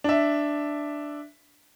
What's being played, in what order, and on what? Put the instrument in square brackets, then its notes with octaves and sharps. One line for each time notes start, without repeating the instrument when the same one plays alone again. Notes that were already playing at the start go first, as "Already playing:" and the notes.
[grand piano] D4 E5